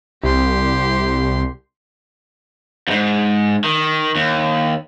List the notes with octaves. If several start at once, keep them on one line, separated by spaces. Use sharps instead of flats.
C2 G4 C6
F2 G#2
D#3
D#2